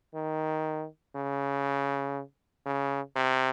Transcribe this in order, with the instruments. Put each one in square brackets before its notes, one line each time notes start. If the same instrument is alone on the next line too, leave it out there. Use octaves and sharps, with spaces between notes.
[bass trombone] D#3
C#3
C#3
C3